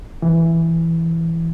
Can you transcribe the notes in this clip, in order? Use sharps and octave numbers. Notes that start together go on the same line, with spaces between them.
E3